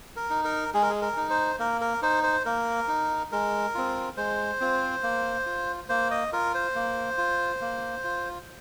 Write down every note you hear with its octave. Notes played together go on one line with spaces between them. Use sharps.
A#4
D#4
A#4
G#3 G#4
A#4
G#4
A#4
D#4
C5
A#3 A#4
A#4
D#4 C5
C5
A#3 A#4
D#4
G#3 A#4
C4 F4
G#3 C5
C4 F4
A#3
F4
A#3 C5
D#5
F4 A#4
C5
A#3
F4
A#3
F4